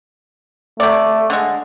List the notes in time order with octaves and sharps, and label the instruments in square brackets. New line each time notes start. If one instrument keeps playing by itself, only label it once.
[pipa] C3 D5 [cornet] A3
[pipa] D3 G#3